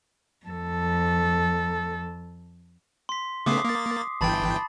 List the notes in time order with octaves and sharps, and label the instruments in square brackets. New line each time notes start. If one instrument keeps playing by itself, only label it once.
[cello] F2 A4
[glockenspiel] C6 B6
[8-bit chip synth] C#3 A3 B3 [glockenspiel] D6 D#6 C7
[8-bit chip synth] A#3 A6
[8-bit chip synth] G1 E3 G5 [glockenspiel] A5 B5 A6